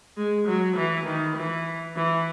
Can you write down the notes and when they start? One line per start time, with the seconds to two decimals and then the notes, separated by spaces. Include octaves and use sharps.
0.17 G#3
0.48 F#3
0.76 E3
1.06 D#3
1.36 E3
1.96 E3